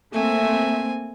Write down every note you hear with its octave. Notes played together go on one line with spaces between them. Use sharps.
A3 A#3 C4 E5 G#5